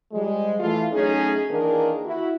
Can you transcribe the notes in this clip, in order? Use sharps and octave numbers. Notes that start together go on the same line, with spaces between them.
F3 G3 G#3
E3 A3 F4
F#3 A3 C#4 D#4 G#4
D#3 E3 A#3 D4 G#4 A#4
E4 F#4